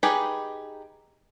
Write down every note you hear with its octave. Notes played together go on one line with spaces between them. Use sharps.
D#4 G4 G#4 B4 B5